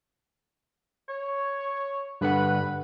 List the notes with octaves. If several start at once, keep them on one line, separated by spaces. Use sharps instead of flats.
C#5
G2 D3 B4 F#5